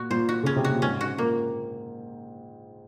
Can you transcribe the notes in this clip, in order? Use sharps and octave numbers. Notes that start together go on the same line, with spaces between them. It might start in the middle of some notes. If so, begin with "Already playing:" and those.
Already playing: A#2 F#4
A#2 C5
F#4
C#3 C#4
C3
A#2 F#4
G#2 C#4
F#4
A#2 A#3